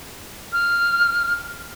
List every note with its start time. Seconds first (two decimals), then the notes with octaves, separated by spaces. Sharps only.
0.53 F6